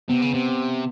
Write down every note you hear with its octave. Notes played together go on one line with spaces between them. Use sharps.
C3 B3
C#3
C3